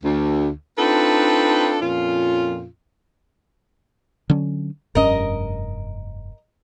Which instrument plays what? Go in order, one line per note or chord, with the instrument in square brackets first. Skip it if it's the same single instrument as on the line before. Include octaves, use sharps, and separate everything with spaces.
[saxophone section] D2
C4 D4 D#4 F4 A4 B4
F2 A#2 C#4 F4
[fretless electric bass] D3 F#3 C#4
[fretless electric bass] F1 G2 C#4 [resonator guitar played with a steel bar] A#4 D#5